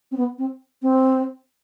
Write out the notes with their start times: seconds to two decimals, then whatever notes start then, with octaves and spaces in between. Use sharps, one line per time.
0.11 C4
0.17 B3
0.38 C4
0.82 C4